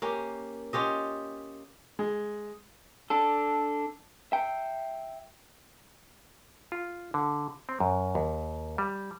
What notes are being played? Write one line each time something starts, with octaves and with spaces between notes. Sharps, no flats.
A#3 C#4 G4
C#4 F4 G4 D#5
G#3
D4 A4
E5 G5
F4
D3
C4
F#2
D#2
G3